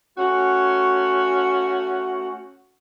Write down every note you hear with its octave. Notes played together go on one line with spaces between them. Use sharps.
A3 C#4 F#4